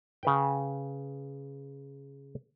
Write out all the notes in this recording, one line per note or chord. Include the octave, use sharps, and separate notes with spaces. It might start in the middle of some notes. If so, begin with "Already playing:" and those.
C#3 B4 G5